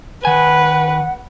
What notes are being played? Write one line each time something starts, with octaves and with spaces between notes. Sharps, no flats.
D#3 B4 F#5 G#5